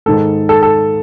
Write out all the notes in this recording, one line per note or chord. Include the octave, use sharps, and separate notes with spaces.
G#2 D#3 G#3 A4
A4
A4